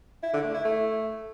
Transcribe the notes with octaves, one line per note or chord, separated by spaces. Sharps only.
E4
D3
A3
E4
A3